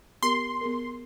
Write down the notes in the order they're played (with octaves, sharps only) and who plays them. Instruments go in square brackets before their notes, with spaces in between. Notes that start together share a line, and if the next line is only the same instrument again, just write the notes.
[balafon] B3 G4 A#4 [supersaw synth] C6
[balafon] B3 G#4 A#4